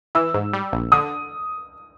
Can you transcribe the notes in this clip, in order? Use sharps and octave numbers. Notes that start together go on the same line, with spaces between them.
E3 E6
G#2
G3
A#1
D3 D#6